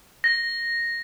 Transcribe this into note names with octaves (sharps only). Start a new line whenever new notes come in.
A#6